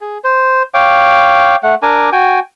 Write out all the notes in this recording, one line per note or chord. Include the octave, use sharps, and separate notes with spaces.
G#4
C5
C#5 F5 G5 D6
A3 F#5
D4 A#4 G#5 D6
F#4 G5 G#5